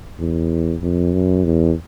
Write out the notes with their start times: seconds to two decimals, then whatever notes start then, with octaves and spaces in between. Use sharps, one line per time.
0.19 E2
0.82 F2
1.13 F#2
1.44 E2